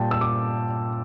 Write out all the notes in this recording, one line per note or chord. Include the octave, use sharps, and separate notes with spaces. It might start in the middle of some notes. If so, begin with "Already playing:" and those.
Already playing: A#2 G3 G5 A5
E6
D6